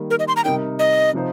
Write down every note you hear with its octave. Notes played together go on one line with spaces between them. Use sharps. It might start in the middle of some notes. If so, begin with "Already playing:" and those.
Already playing: D#3 G3 A#3
A#4
D#5
C6
A#5
C3 G3 D#4 A#4 G5
D#5
C3 F3 D#4 C5